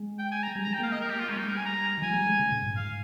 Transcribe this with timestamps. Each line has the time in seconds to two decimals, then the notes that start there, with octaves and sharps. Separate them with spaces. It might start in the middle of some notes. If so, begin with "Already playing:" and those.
Already playing: G#3
0.19 G5
0.31 G#5
0.43 A#5
0.56 G3
0.64 A#5
0.67 G#3
0.73 G5
0.80 A#3 F5
0.92 D#5
1.01 A#4
1.10 G4
1.20 F4
1.29 G#3 C#4
1.36 G3 D#4
1.41 G#3
1.47 A#4
1.53 G3 G#5
1.65 A#5
1.98 D#3
2.02 F3 G#5
2.10 G#3
2.15 G3
2.27 G#3
2.39 C#3
2.52 A#2
2.64 G#2
2.76 F5